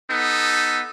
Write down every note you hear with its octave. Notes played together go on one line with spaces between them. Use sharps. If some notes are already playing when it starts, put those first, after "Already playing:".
B3 D#4 A4